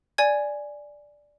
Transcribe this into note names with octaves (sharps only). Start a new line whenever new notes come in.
D5 G#5 G#6